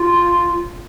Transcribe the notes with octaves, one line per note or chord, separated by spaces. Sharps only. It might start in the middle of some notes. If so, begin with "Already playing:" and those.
Already playing: F4